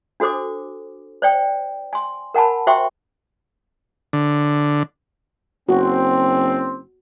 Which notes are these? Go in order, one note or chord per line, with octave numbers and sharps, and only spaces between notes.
D4 F#4 A4 C5 D6
C5 D5 G5
G#5 C6
A#4 F#5 G#5 A5 B5
F#4 C5 E5 G5 C6 C#6
D3
F#1 C4 F#4